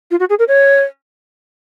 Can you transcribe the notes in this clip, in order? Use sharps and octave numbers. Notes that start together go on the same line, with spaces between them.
F4
F#4
G#4
A#4
C#5